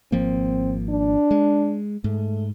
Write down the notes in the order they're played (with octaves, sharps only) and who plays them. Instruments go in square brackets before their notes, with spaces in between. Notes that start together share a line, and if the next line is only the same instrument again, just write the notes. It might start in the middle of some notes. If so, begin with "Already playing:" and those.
[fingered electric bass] G#1 F3 A#3 [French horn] C4
[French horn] D4
[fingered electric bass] G#3
[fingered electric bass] G#2 [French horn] A3